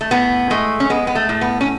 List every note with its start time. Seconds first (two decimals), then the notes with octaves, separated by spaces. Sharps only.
0.01 A3
0.11 A2 B3
0.50 G#3 A3
0.80 C#4
0.90 G#3 B3
1.07 B3
1.15 A3
1.29 A2
1.41 B3
1.61 C#4